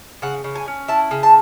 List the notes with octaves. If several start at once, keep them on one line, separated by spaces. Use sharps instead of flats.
C#3 F#5
C#3
G#5
C#4
E4 A5
C#3
A5